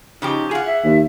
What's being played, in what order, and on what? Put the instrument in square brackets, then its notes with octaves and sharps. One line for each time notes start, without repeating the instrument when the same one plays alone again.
[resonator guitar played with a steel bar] C#3 F3 G4 [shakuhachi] D#4
[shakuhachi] F4 [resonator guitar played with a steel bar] G#4 F#5
[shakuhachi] E5
[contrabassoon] D#2